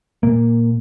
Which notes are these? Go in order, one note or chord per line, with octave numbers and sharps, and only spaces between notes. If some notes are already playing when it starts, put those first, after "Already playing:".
A#2 A#3